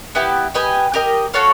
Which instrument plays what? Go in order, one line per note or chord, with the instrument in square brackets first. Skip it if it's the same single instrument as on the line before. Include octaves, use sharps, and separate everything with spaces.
[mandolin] B3 E4 G4
G4 B4 D#5 G#5
G4 A#4 D#5
F#4 A4 C#5 F5